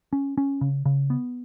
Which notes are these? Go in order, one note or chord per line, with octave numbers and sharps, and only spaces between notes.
C#4
C#4
C#3
C#3
B3